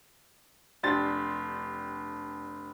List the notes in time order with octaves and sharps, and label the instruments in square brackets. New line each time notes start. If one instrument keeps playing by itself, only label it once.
[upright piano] F1 D4 G4 C6 A6